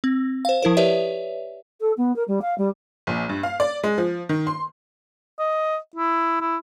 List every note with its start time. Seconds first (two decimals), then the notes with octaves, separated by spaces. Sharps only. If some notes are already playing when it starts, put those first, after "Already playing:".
0.04 C4
0.45 C5 F5
0.62 F3 E4 A#4 C5
0.77 G4 B4 C#5 D5 E5
1.79 A4
1.97 B3
2.15 A#4
2.27 G3
2.41 F5
2.57 G3
3.07 A#1
3.29 G2
3.43 F5
3.60 D5
3.84 G#3
3.98 F3
4.29 D#3
4.47 C6
5.39 D#5
5.96 E4
6.41 E4